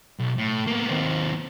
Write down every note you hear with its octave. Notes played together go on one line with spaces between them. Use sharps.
B1
A2
A#3 B3
D#2 C4